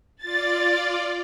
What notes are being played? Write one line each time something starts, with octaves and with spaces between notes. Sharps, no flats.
F4 D5 A6